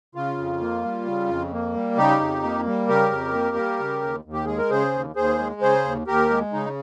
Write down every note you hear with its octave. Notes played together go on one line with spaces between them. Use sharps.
C#3 F4
F2
A#3
G3
C#3
F2
A#3
G3
C#3 D#4 G4
F2
A#3
G3
C#3 G4 A#4
F2
A#3
G3
C#3
D#2
D#2
G4
G#3 G#4
A#4
C#3 G#4 C5
D#2
D#2 G#4 C5
G#3
C#3 G#4 C5
D#2
D#2 G4 A#4
G#3
C#3 D#4